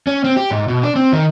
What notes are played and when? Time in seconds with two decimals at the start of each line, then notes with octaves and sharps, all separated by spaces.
0.07 C#4
0.24 C4
0.36 G4
0.51 G#2
0.68 B2
0.83 D4
0.96 C4
1.13 D#3